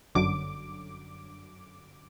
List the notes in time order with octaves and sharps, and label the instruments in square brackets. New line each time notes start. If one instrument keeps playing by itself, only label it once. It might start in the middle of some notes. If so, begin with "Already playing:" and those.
[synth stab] G1 F#2 D3 F#3 D6